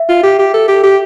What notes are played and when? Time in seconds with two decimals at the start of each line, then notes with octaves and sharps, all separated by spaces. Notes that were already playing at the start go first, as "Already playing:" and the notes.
Already playing: E5
0.09 F4
0.23 G4
0.39 G4
0.54 A4
0.68 G4
0.83 G4